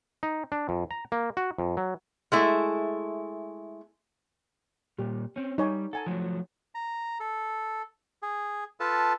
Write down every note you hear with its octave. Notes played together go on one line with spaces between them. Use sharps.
D#4
D4
F2
A#5
A#3
F#4
F2
F#3
G#3 A3 E4
A#2 G3 G4
C4 C#4
G3 D#4 C#5 G#5
A4 F#5 G#5 A#5
F3 F#3 A3
A#5
A4
G#4
F4 A4 B4 A5